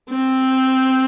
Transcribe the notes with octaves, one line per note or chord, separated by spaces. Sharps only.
C4